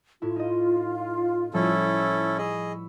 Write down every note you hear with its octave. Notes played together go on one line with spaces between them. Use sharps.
A2 E4 F4
D#4 D#5
A2 F3 G3 C#4 E4 A4
G#4 D#5 B5 C#6 E6